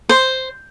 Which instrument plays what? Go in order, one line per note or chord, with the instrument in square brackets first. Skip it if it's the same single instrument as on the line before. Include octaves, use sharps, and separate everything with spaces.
[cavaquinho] C5